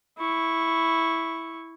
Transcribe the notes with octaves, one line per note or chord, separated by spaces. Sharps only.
E4 C#6